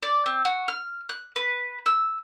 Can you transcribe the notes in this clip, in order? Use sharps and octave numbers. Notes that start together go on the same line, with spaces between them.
D5
C4
F#4
F6
F#6
B4
E6